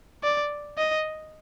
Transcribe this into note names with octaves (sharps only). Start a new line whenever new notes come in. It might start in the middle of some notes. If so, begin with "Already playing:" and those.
D5
D#5